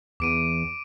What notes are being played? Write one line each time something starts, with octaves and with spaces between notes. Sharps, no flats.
E2 D6 D7 D#7